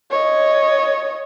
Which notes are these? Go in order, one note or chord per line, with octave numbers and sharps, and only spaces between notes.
C#5 D#5